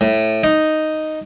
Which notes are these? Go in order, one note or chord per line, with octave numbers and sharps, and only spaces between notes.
A2
D#4